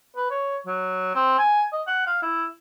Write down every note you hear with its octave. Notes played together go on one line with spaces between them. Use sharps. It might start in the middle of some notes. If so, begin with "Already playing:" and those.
B4
C#5
F#3
C4
G#5
D#5
F#5
F5
E4